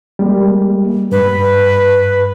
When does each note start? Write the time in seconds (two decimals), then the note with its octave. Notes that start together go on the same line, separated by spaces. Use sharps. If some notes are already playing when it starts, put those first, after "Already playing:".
0.19 G3 G#3 A#3
1.12 G2 B4